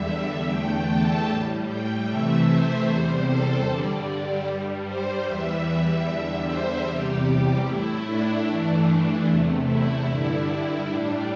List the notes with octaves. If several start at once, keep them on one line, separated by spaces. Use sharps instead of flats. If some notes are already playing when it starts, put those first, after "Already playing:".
Already playing: E2 D3 G3 E5
E2 D3 A3 G5
A5
A2 G3
G5
C3 E3 A3 E5
C5
E2 C3 G3 C5
A4
G2 D3 G3 D4
G2 G3
C5
E2 E3 G3 E5
E2 D3 G3 E5
C5
E2 C3 G3 G4
A2 A3 E4
D4
G2 E3 A3 D4
E2 C3 A3
E4
G2 D3 G3 E4
E4
A2 G3 D4